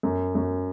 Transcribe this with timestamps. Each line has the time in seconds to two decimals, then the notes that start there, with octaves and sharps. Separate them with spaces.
0.03 F#2
0.35 F#2